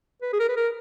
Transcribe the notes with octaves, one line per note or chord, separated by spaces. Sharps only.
B4
G#4
A#4
B4
A#4